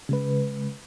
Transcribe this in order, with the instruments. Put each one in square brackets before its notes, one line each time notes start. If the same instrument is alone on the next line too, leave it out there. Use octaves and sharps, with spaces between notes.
[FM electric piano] C#3 G#3 B4